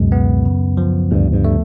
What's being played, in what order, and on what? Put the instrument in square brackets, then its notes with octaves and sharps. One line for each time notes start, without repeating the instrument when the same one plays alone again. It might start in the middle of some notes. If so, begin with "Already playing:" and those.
Already playing: [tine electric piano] C#2 B2 G#3 [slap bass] F#2
[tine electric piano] B3
C#3
F3
[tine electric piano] D2 [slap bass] G2
[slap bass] G2
[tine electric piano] A3